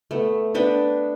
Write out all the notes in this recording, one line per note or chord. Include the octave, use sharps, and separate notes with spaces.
A3 B3
B3 D4 B4 G5